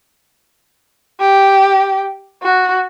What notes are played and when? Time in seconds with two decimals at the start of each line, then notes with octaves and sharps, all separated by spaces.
1.21 G4
2.43 F#4